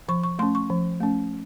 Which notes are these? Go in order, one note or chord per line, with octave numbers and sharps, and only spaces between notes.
F3 C#6
C#6
A3 C#4 C6
C#6
F3
A3 C#4